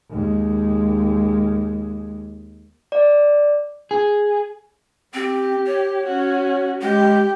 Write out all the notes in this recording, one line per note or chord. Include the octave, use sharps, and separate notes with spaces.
D#2 G#3
D5
G#4
C4 G4
C#5
C#4 F#4
G#3 G4 G5